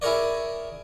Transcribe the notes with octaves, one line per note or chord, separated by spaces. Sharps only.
E4 G#4 A#4 C#5 D5